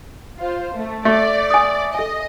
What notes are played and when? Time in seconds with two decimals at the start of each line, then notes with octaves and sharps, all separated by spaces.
0.39 F4 C5
0.75 A3
1.05 A3 D5
1.50 G#5 D#6
1.95 A4 D#5 G#5